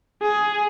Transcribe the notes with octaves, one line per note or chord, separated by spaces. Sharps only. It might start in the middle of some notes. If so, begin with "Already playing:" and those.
G#4